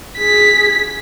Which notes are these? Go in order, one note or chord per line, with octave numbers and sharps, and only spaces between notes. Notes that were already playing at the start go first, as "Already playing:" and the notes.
G#4 B6